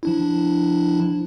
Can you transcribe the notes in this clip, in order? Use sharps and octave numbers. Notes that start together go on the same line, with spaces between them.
F3 D4 E4